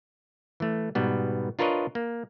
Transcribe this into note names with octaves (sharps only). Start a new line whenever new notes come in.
E3 A3
G#2 B2 G3 B3
D4 F4 A#4 B4 C#5 D#5
A#3